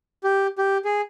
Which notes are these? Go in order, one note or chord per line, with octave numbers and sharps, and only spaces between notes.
G4
G4
G#4